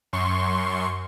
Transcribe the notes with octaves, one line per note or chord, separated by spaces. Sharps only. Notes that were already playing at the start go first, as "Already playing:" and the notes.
F#2 C6 C#6